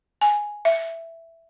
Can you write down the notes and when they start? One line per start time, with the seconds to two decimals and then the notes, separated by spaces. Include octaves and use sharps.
0.21 G#5
0.65 E5